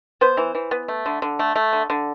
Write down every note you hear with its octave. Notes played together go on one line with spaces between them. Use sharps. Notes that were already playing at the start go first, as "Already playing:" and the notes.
B3 C5
E3
E3
B3
A3
D3
D3
A3
A3
D3
D3